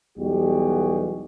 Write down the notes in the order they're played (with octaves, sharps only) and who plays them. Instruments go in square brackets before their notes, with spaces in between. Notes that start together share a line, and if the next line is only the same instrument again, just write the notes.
[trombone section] B1 E2 G3 G#3 F#4 G4